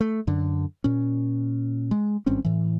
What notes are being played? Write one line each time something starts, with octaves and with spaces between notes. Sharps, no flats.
A3
F#2 D3
A#2 C#4
G#3
G#1 G2 C4 C#4
A2 E3